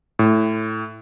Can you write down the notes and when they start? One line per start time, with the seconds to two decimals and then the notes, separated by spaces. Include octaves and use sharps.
0.19 A2